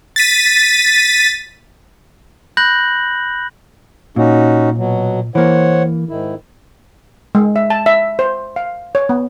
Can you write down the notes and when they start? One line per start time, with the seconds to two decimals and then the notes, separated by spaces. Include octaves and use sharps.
0.16 A6 B6 D#7
2.57 B5 F#6 G6 A#6 F#7
4.16 A#2 C#4 D#4 F#4
4.78 B2 F#3
5.35 E3 A#3 C5 C#5 F#5
6.09 G#2 D#3 E4
7.35 G#3
7.56 E5
7.70 A5
7.86 E5
8.19 C5
8.56 F5
8.95 C#5
9.09 B3